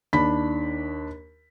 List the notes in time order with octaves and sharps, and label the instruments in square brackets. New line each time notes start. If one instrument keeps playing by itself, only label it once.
[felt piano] D#2 D4 B5 B6